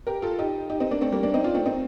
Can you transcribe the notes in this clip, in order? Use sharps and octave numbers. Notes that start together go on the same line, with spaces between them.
G4 A#4
F4 A4
D#4 G4
D#4 G4
C4 D#4
A#3 D4
A3 C4
G3 A#3
A#3 D4
C4 D#4
D4 F4
A3 C4
C4 D#4